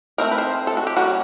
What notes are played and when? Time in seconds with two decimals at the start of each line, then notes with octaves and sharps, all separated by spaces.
0.18 A3 C4 D#4 A#4
0.31 B4
0.38 C5
0.67 A4
0.77 F#4
0.87 G4
0.96 G3 A#3 C#4 F#4